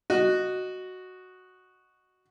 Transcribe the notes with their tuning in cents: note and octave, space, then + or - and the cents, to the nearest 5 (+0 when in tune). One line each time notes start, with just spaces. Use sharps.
F#4 +0 D#5 -10